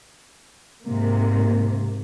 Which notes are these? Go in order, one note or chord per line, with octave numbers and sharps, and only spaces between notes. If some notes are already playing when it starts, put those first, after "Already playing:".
G#2 C3 A#3